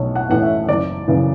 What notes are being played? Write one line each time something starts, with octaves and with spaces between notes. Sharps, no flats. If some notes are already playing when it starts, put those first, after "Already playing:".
Already playing: B1 A2 C#5
F#5
A2 E3 F#5
E5
F#1 D5
F#2 C#3 E3